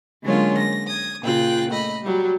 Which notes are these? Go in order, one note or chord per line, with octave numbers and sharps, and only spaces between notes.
D3 F#3 G#3 A#3 C#4 F4
A#6
D#6 G#6
A#2 C#3 F4 G5 F#6
A3 D#5 B5
F#3 G3